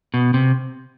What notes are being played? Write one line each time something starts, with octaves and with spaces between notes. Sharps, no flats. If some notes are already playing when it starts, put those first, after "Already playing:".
B2
C3